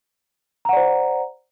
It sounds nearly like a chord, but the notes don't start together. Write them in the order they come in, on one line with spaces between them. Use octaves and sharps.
A#5 F#5 D5 C5